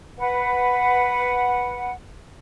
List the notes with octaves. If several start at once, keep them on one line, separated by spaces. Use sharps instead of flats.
B4 F#5